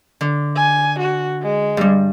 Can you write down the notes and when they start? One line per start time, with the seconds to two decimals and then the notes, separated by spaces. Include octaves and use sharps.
0.21 D3
0.56 G#5
1.00 F#4
1.42 G#3
1.77 G2 G3